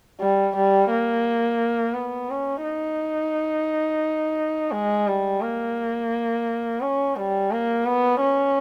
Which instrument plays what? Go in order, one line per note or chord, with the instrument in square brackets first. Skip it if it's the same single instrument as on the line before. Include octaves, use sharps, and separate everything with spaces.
[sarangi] G3
G3
A#3
B3
C#4
D#4
G#3
G3
A#3
C#4
G3
A#3
B3
C#4